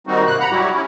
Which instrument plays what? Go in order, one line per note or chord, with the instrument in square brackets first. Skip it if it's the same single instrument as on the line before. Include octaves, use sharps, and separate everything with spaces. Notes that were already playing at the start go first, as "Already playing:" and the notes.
[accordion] D#3 G3 A#3 C4 D#4 F#4
G#2 C3 A#3 F#6
F#5 A#5 B5
F#3 G3 E4 F#4 G4
C#4 E4